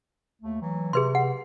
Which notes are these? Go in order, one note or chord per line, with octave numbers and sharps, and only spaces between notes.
D#2 A3
E3 F#3
C3 G#4 B4 C6
F#5